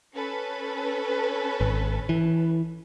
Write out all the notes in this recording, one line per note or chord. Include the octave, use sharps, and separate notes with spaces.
C#4 A4 B4
G#1
E3